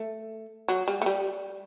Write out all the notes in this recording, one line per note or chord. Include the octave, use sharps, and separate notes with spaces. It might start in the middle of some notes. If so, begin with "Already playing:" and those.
Already playing: A3
F#3
G3
A3
G3